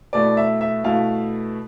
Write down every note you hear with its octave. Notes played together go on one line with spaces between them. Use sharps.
B2 A3 E4 D5
E5
E5
B2 A3 E4 F5